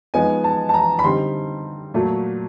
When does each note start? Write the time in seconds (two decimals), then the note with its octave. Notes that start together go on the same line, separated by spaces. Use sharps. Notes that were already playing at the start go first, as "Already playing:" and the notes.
0.14 F3 G#3 B3 D#4 G#5
0.44 A5
0.69 A5
0.74 A#5
0.99 B5
1.04 D3 G3 C4 D#4 C6
1.94 A#2 F#3 A3